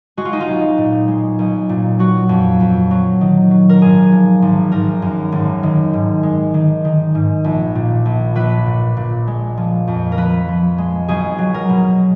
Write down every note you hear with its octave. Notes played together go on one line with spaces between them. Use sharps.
G#3 F#4
F4
D#4
F4
B1
A#2
G#3
B1
A#2
F#3 F#4
F2
F2
F#3
D#3
F#3
A#4
G#1 G#4
F3
G#1
G#1 A#4
F#2
G#1
D#3
G#2
G#3
D#3
D#3
G#2
A#1
A#2
A#1
A#1 B4
A#2
A#2
G#3
F3
F2
A#4
F3 B4
F3
G#3
B1 G#4
F#3
A#4
B2